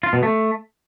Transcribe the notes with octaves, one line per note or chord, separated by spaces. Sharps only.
F4
B2
A3